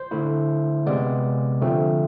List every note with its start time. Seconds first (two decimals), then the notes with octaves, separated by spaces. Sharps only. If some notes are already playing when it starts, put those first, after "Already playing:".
Already playing: C5
0.11 D3 A3 E4
0.86 C3 G#3 B3 D5
1.62 D3 F3 A3 C4